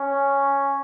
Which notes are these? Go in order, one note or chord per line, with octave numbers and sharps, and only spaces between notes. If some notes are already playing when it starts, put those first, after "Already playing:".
Already playing: C#4